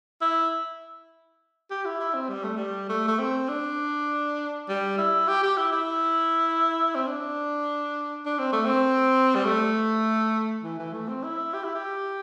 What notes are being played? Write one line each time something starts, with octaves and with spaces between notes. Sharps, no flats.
E4
G4
E4
E4
C4
G3
A3
G3
A3
A3
C4
D4
G3
E4
G4
G4
E4
E4
C4
D4
D4
C4
A3
C4
G3
A3
E3
E3
A3
C4
E4
G4
E4
G4